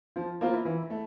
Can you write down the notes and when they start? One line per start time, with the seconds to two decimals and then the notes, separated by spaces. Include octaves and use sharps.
0.16 F3 F4
0.41 A#3 E4 F4 C5
0.54 E4
0.65 E3 E4
0.82 E4
0.90 A3